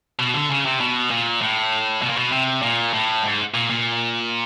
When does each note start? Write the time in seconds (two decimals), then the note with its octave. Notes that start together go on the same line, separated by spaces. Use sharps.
0.19 B2
0.34 D3
0.50 C#3
0.65 C3
0.80 B2
1.11 A#2
1.41 A2
2.02 B2
2.10 A#2
2.17 B2
2.32 C3
2.62 A#2
2.93 A2
3.23 G#2
3.54 A#2
3.70 A#2